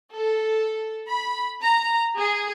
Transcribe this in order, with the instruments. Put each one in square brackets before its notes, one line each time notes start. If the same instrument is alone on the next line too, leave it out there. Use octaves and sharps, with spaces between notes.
[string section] A4
B5
A#5
G#4